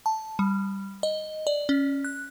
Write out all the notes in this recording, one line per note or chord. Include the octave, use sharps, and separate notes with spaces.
A5
G3
D#5
D5
C#4
F#6